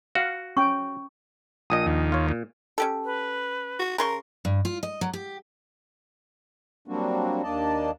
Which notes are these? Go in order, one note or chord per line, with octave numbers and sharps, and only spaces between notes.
F#4 F5 F#5
C#4 G5 C#6
A#1 A#2 D#5 D#6
D#2
F4 C#5
A#2
C#4 G4 A4
B4
F#4
C#3 A#4 C6 C#6
G2
F4
D#5
F#3
G4
F#3 G3 A#3 C4 D4 F#4
D#2 A#3 D4 D5 D#5 A5